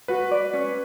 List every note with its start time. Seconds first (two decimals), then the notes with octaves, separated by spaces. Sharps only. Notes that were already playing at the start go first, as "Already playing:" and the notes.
0.08 F#4 B4
0.31 D5
0.53 C#4